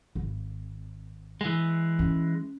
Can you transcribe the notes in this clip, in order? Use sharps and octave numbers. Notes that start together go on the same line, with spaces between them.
G#1
E3 G#3
C#4